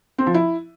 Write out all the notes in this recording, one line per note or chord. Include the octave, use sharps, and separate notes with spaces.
C4
F3
E4